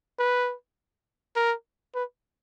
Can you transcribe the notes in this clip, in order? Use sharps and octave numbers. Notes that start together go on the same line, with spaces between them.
B4
A#4
B4